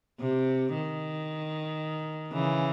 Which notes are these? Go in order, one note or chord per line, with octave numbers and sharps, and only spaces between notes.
C3
D#3
C#3 E3